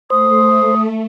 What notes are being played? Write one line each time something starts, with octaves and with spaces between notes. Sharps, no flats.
A3 C5 D#6